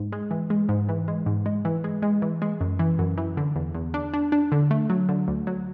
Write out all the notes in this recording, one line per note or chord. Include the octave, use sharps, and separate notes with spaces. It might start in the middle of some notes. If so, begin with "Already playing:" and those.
Already playing: G#2
G#3
E3
G#3
G#2
E3
G#3
G#2
G#3
E3
G#3
G#3
E3
G#3
F#2
E3
F#2
E3
D3
E2
E2
D4
D4
D4
D3
A3
F#3
D3
D2
F#3